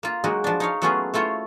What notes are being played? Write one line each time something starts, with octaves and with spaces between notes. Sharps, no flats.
A#3 F4
F#3 G#3 A#3 D#4 F#4
F3 D4
D#4 C#5 F5
F#3 A3 B3 C#4 F4 G#4
A3 E4 F4 C5 C#5